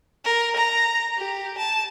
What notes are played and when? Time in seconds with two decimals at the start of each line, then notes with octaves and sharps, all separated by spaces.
0.24 A#4
0.56 A#5
1.18 G4
1.58 A5